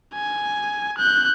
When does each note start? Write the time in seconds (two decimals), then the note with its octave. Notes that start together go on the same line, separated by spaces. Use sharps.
0.14 G#5
0.98 F#6 G6